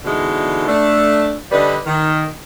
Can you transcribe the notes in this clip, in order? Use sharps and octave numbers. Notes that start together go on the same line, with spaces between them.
B2 D3 E3 G#3 D#4
A3 D4
D3 G3 D4 B4 D#5
D#3